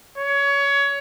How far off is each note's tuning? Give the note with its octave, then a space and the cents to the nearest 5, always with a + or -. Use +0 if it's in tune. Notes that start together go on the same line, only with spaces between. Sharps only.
C#5 +20